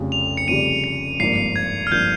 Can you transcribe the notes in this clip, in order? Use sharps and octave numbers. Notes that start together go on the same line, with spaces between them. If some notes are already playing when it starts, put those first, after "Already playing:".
Already playing: F1 F2 C#3 G3
F7
C#7
F1 F2 C#3 G3 D#7
C#7
G#1 G2 F3 A#3 C7
G#6
F6
G2 F3 A#3 G6